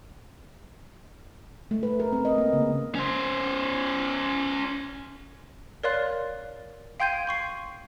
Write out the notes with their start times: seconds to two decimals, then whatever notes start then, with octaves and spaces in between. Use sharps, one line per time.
1.71 A3
1.83 B4
2.00 A#4
2.13 C4
2.25 D#5
2.38 A#3
2.53 C#3
2.95 C#4 C5
5.83 A#4 C#5 D5 F5 C6 F#6
7.00 F5 G5 C6 G6 G#6 D#7
7.27 C6 C#6 C7